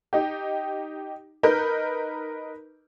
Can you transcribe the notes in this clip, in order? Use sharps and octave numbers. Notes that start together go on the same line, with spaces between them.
D#4 G4
D#4 A#4 B4 G6